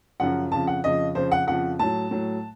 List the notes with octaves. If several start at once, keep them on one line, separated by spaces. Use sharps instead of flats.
F#2 C#3 F3 F#5
F2 C#3 F3 A5
F#5
F2 C#3 F3 D#5
F2 C#3 F3 C5
F#5
F2 C#3 F3 F#5
A2 F#3 A5
A2 F#3